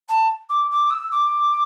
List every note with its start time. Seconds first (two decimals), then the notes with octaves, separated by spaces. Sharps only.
0.08 A5
0.49 D6
0.70 D6
0.90 E6
1.11 D6